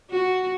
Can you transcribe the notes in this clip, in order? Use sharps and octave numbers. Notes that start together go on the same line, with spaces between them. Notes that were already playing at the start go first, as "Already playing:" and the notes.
F#4